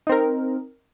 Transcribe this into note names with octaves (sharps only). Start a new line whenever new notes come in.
C4 D#4 A#4